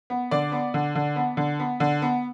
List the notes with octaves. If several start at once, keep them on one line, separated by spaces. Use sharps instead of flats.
B3
D3 D5
B3
D3
D3
B3
D3
B3
D3
B3